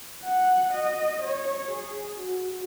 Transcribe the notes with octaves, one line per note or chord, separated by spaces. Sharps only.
F#5
D#5
C#5
G#4
F#4